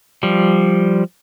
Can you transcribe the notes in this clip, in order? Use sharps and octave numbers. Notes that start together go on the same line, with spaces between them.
F3 G3